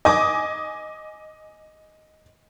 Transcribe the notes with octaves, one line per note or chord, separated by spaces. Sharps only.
D#5 G#5 D6 D#6